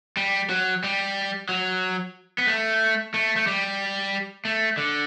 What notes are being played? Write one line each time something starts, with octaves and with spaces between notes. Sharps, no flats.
G3
F#3
G3
F#3
B3
A3
A3
A3
G3
A3
D3